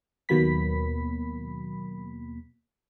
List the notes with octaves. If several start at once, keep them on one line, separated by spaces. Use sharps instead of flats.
D#2 B2 F#3 A#3 B5 B6